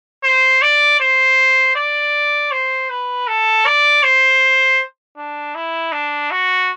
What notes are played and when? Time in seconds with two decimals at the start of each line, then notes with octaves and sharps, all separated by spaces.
0.24 C5
0.62 D5
1.00 C5
1.76 D5
2.52 C5
2.90 B4
3.27 A4
3.66 D5
4.03 C5
5.17 D4
5.55 E4
5.92 D4
6.31 F#4